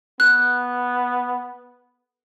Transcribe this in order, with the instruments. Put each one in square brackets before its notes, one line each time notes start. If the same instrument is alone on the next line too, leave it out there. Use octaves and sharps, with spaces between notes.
[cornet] B3 [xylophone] F#6